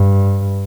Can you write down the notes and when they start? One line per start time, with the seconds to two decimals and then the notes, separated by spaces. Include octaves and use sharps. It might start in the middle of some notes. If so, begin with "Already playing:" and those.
Already playing: G2